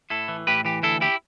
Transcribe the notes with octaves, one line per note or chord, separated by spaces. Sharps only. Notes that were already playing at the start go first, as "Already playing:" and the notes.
A2 E4 A4
E3
A2 G4 B4
E3 G4
D2 E4 A4
E4 G4